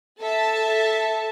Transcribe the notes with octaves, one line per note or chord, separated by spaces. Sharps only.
A4 E5 A5